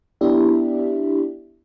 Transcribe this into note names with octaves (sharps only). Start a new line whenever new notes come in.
B3 D4 E4 G4 D5 E5